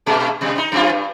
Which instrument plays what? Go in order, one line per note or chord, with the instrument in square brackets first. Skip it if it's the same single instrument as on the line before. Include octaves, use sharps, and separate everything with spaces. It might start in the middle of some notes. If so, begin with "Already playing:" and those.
[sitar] G2 A#2 G#3
B2 G3
D#4
F#2 C3 F4
G2